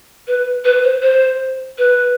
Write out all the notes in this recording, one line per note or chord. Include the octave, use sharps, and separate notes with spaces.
B4
B4
C5
C5
B4